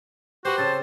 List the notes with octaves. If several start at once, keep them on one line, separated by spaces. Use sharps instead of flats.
F#4 G4 B4 C5
C#3 C4 A5